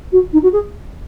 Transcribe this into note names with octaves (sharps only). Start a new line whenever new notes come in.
F#4
D#4
F#4
G#4